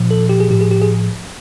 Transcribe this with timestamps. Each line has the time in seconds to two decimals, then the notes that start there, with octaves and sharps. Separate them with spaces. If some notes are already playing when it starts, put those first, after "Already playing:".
Already playing: A#2 F3
0.11 A4
0.29 G4
0.40 G#4
0.50 A2 F3 G4
0.61 G#4
0.71 G4
0.82 G#4